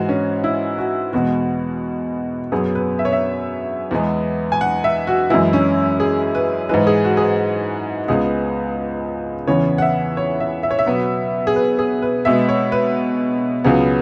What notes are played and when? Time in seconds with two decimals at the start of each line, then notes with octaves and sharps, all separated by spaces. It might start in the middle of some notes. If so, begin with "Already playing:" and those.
Already playing: G#2 E3 G#3 F#4
0.09 C#4
0.44 E4
0.78 F#4
1.13 E2 B2 G#3 F#4
2.52 F#2 F#3 B3 G#4
2.75 B4
2.99 E5
3.05 C#5
3.13 E5
3.91 E2 E3 G#3 B3
4.52 G#5
4.61 F#5
4.84 E5
5.07 F#4
5.30 F#2 E3 G#3 E4
5.53 C#4
6.00 G#4
6.35 B4
6.69 G#2 E3 G#3 B4
6.87 G#4
7.04 F#4
7.17 G#4
7.21 B4
8.08 C#2 C#3 G#3 B3 G#4
9.47 E2 C#3 E3 B3 C#5
9.78 F#5
9.82 E5
10.17 C#5
10.40 E5
10.63 E5
10.71 C#5
10.79 E5
10.86 B2 F#3 B3
11.47 G#4
11.56 B4
11.79 G#4
12.02 B4
12.25 B2 G#3 B3 E5
12.49 C#5
12.72 B4
13.64 C#2 C#3 F#3 B3 G#4